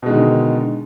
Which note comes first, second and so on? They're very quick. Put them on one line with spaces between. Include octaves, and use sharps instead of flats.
B2 G#3 D#3 D3